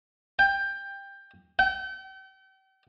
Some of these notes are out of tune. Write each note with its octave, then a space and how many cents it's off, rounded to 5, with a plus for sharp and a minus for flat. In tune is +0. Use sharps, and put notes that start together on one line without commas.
G5 +15
G5 -40